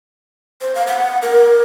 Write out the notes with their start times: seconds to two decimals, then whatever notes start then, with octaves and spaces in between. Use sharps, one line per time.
0.61 C5
0.75 F5
0.87 F#5
1.22 A#4